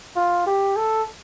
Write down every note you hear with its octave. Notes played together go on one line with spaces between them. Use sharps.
F4
G4
A4